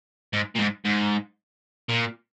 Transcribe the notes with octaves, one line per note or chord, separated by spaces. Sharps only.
G#2
A#2
G#2
G#2
A#2